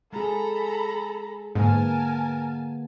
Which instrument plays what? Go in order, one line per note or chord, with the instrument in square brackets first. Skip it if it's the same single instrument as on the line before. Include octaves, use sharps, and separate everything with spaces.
[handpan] G#3 G#4 [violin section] A4 [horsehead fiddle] A#5 B5
[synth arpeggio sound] G#2 [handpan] D3 A#3 B3 [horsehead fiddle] A#4 [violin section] G#5 A5